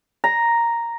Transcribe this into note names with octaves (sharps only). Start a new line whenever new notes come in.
A#5